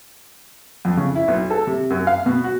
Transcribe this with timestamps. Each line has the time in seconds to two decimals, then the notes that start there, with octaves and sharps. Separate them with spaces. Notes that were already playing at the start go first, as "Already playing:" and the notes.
0.85 F2
0.97 C#3
1.15 E4
1.28 B1
1.50 A4
1.67 C3
1.90 F#2
2.07 F5
2.26 B2
2.44 F#4